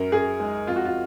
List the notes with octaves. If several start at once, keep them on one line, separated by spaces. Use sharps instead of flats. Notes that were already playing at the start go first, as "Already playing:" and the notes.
Already playing: F#2 A#4
F#2 G#4
G#3 D#4
F2 F4
F#4
F4